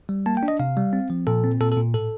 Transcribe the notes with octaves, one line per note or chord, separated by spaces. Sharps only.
G3
A#3 A5
G5
D4
D#5
C3 F5
G3
C4
F3
A#2 A4
C4
A#2 A4
A4
A#2
A2 A4